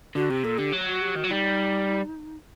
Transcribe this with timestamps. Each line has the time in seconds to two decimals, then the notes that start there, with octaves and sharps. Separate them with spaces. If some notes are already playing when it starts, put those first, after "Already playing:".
0.15 D3 F#4
0.30 C3 G4
0.44 A#2 A4
0.58 D3 G4
0.73 F#3
0.87 F#4
1.01 G4
1.16 D#3 F#4
1.24 F#3
1.30 G3 D#4